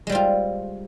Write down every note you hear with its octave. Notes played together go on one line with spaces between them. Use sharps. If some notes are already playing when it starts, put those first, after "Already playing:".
G3 G#3 C4 F4